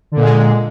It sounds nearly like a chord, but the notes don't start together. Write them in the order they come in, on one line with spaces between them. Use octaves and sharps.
D3 A#2 G#3